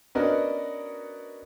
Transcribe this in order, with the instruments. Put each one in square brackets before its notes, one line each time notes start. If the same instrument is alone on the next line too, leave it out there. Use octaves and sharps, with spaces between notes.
[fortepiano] B3 C#4 D4 F#4 A#4 D#5